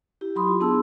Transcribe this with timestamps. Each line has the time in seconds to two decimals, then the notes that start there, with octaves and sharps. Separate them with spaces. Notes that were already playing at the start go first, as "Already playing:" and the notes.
0.21 E4 G4
0.35 F#3 B5 C6 D#6
0.48 F4
0.60 B3 D4 G#4 A5 C6 E6